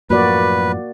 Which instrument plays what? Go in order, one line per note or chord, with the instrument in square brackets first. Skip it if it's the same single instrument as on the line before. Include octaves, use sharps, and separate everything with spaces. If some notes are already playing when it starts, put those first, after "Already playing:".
[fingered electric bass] F#2 A2 F3 [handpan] A#3 F#4 D5 [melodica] B4